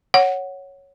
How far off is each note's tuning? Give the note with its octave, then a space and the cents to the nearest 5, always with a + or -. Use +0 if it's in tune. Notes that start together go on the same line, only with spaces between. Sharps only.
C#5 +0 F#5 +0